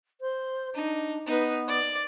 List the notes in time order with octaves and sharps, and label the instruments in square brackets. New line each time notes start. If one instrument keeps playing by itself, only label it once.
[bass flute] C5
[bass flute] D4 [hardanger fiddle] D#4
[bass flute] B3 [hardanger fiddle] D#4 B4
[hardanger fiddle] D5